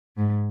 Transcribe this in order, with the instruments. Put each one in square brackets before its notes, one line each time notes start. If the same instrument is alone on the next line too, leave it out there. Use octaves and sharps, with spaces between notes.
[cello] G#2